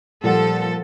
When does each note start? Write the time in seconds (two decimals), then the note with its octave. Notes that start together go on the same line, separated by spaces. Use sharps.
0.24 A#2 F3 G3 A4 F#5